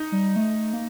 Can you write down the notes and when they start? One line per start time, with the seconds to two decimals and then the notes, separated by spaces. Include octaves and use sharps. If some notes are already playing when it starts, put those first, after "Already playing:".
Already playing: D#4
0.12 G3
0.36 A3
0.73 A#3